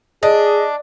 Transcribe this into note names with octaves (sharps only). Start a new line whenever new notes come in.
D4 G#4 D#5